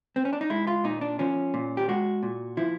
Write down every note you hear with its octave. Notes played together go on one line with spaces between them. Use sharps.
C4
C#4
D4
D#4
G#3 E4
F4
A#2 D#4
D4
F3 C#4
A#2
G4
G#3 F#4
A#2
F3 E4